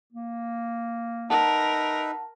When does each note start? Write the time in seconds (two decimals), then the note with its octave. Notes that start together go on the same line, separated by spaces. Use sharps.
0.13 A#3
1.30 D#4 A#4 B4 E5 F#5 A5